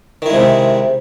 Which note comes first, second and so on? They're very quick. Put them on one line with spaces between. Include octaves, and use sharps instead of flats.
D#3 E4 G#3 C3